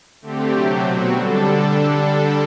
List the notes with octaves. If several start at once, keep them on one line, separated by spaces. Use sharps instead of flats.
D3 A3 C4 G4
C3 F#3 A3 C4 G4
B2 F#3 C4 F#4
D3 G3 D4 A4